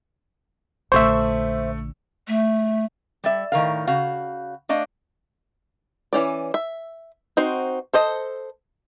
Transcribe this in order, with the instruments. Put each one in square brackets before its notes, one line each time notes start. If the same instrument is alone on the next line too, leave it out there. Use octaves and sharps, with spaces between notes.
[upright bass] A#1 D3 [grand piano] A3 C#6 [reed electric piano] C5 E5
[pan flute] A3
[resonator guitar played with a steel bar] G3 D5 E5
A2 D#3 A#4 F5
C#3 F#4 F5
A3 D4 D#5 F5
[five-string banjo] E3 C#4 D5
E5
C4 D#4 F#4 C5
A4 C5 D#5